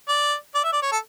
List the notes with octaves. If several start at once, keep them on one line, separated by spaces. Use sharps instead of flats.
D5
D5
E5
D5
C#5
A4